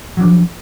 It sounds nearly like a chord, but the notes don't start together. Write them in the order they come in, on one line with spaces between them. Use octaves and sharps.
F#3 D4 F3